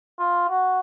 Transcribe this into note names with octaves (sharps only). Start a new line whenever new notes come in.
F4
F#4